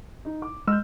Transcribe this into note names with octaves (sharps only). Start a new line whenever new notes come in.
D#4
D6
G#3 E6 F6 G6